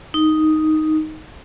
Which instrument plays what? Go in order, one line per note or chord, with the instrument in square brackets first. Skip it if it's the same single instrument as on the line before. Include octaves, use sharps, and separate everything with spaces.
[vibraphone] D#4